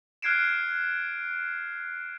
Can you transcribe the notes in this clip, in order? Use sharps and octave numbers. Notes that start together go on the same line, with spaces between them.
F6 F#6 G#6 C7 D7 E7